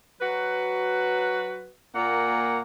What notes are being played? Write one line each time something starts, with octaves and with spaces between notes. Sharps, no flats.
F#3 F#4 B4
A#2 A#3 F#5